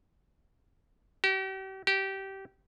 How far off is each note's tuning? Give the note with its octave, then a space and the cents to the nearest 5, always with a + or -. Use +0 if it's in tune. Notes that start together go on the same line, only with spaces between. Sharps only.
G4 -40
G4 -20